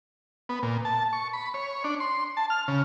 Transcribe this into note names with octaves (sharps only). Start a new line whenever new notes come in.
B3
A#2
A5
C#6
B5
C#5
D4
C6
A5
F6
C#3